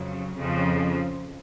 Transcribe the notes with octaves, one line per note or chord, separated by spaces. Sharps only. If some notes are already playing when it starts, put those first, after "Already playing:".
Already playing: F2 C#3 F#3
F2 C#3 F3